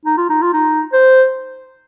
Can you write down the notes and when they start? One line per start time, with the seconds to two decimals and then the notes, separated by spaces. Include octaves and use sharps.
0.06 D#4
0.18 F4
0.30 D#4
0.42 F4
0.54 D#4
0.93 C5